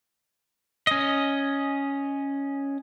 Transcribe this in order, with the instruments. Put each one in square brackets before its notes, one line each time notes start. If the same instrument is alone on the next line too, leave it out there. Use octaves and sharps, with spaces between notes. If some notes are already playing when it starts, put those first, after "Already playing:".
[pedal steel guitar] C#4 D#5